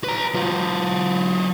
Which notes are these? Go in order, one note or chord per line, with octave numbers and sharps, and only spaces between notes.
B4 A#5
F#3 F4